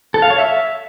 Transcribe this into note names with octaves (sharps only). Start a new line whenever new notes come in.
A4
F5
C#5
E5